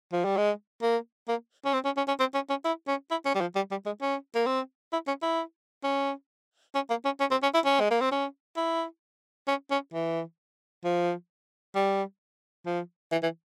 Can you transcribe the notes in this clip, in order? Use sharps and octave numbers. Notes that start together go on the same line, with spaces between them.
F3
G3
G#3
A#3
A#3
C#4
C4
C#4
C#4
C#4
C4
C#4
C#4
E4
C#4
E4
C#4
G3
F3
G3
G3
G#3
C#4
A#3
C4
E4
C#4
E4
C#4
C#4
A#3
C#4
C#4
C4
C#4
E4
C#4
G#3
A#3
C4
C#4
E4
C#4
C#4
E3
F3
G3
F3
E3
E3